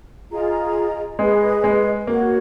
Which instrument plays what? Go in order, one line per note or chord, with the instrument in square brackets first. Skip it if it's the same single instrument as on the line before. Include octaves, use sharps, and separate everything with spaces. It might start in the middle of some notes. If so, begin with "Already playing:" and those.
[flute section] F4 G#4 D#5 A#5
[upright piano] G#3 [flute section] G#4 B4 D#5
[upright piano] G#3
[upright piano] A#3 [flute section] F#4 C#5 F#5